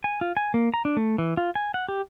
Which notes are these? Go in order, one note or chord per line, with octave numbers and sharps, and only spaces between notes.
G#5
F4
G#5
A#3
A#5
D4
A3
E3
F4
G#5
F#5
G4